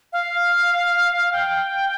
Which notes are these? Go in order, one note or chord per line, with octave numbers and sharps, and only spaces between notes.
F5
G5